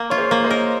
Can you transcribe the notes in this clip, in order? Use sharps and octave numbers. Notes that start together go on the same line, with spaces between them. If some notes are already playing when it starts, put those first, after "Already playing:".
Already playing: A#3
F4 C#5
G#4 C5
A#3
C5 D#5
A#4